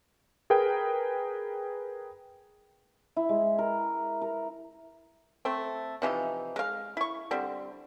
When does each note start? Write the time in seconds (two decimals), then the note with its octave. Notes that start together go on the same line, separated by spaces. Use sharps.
0.50 G#4 A#4 B4 G5
3.16 E4
3.29 G#3
3.59 A#4
4.22 A#4
5.45 A3 C4
6.02 C3 E3 F3 D#4
6.56 G#3 F5
6.97 E4 C#6
7.31 D3 G3 C4